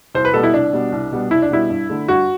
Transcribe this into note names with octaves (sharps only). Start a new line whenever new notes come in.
C2 C5
B4
B2 G3 B3 A4
E4
C2 D4
B2 G3 B3
C2
B2 G3 B3
C2 E4
D4
B2 G3 B3 E4
G2
D3 A3
G2 F#4